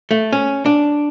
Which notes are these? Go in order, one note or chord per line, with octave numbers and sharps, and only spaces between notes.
A3
C#4
D4